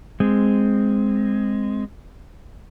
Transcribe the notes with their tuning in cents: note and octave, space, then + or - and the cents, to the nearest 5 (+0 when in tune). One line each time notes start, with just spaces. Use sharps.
G#3 +0 C4 -5